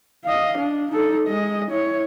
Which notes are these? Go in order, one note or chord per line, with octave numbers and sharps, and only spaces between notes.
D#5 F5
D4
D#4 A4
G#3 D#5
E4 C#5